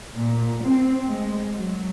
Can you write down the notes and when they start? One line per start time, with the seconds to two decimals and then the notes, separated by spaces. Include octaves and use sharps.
0.15 A#2
0.63 C4
1.08 G#3
1.57 F#3